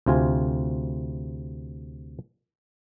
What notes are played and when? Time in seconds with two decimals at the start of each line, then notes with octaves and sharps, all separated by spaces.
0.06 D2 C3 F4 G#5